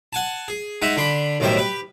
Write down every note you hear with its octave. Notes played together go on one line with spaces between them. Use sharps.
F#5 G#5 A5
G#4
G#3 D#4 E5 F#5
D3 D4 B5 C6
B1 A2 D#3 G3 C5 E5
G4 B4